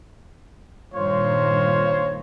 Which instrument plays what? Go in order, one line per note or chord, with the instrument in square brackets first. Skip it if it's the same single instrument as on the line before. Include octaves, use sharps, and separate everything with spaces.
[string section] G2 A#2 D#3 [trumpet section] F4 C5 C#5